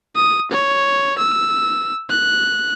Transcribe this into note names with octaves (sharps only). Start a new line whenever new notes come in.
D#6
C#5
E6
F#6